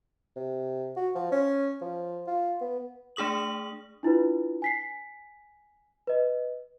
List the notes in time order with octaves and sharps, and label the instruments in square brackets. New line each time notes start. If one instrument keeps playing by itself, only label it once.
[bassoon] C3
F#4
F3
C#4
F3
F4
B3
[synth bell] A3 D4 G#4 D#6 F#7
[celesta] D4 E4 F4 B4
G#5 B6 C7
B4 D#5